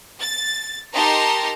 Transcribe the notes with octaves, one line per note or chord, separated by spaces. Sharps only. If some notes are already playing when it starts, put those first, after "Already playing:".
A6
D#4 G4 A#4 A5 A#5 C6